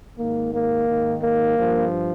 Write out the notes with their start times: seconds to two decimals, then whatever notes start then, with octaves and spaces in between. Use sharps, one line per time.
0.18 G#2 D#3 A#3
0.53 A#3
0.88 G#2 D#3
1.22 A#3
1.57 G2 F3